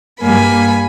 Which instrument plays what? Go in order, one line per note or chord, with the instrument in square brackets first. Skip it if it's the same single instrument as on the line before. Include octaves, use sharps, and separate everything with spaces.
[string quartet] G2 G3 A#3 G#5 B5